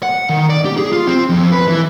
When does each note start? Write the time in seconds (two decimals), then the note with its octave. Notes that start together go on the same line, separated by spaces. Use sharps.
0.03 F#5
0.29 D#3
0.50 D5
0.65 G4
0.77 G#4
0.92 F4
1.07 C4
1.29 F2
1.52 B4
1.68 E3